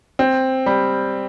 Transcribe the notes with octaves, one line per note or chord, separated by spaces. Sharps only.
C4
G3